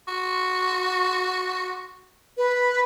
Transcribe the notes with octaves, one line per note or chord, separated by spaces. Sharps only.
F#4
B4